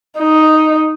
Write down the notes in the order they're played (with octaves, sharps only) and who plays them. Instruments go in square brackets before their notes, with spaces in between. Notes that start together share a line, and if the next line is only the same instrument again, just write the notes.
[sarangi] D#4